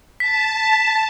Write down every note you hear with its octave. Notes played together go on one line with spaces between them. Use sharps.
A5 B6